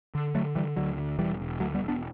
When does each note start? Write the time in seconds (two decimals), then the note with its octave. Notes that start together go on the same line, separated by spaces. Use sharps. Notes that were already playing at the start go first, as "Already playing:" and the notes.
0.15 D3
0.35 D3 F#3 A3
0.55 D3 E3 G3
0.76 D2 D3 F#3
0.98 D3
1.18 E1 E3 G3
1.40 E1
1.60 D2 F#3 A3
1.74 G3 B3
1.82 E1
1.88 B3 D4